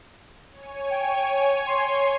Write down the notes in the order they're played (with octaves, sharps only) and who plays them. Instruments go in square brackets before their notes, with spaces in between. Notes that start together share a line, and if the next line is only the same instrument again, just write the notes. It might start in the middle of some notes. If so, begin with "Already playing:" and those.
[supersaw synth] C#5 G#5
[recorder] G5
C6